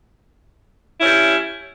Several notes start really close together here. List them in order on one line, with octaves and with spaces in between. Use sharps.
E4 C#4 G3